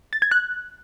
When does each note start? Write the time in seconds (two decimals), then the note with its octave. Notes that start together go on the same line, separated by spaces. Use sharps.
0.13 A6
0.22 G#6
0.31 F#6